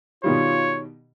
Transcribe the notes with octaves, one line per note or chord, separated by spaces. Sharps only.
B2 D#3 G3 F4 C#5